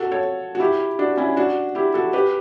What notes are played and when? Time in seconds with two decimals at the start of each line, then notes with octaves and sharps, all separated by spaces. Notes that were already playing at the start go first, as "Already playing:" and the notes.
Already playing: F#4 A4
0.11 A4 C#5
0.55 F#4
0.60 E4 G4
0.99 D4 F#4
1.17 C#4 E4
1.36 D4 F#4
1.75 E4 G4
1.94 F#4 A4
2.13 G4 B4